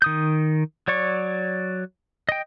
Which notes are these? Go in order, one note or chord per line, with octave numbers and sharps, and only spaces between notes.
D#3 D#6 G6
F#3 C#5 D5 C#6
D#5 G5